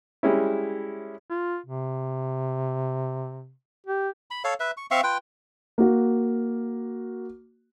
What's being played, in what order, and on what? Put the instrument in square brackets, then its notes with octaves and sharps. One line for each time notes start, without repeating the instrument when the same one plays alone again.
[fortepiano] G3 G#3 C#4 E4
[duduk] F4
C3
G4
[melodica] B5
A4 C#5 F5
B4 E5
C#6
C4 E5 F5 C#6
F4 B4 G5
[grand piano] A#3 F#4